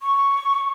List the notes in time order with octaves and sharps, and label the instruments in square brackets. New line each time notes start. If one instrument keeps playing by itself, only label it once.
[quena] C#6